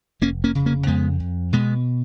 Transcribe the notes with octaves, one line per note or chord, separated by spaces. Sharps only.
F1 A#3 C#4
A#3 C#4
C#3
A#3 C#4
F2 G#3 B3
F2
B2 G#3 B3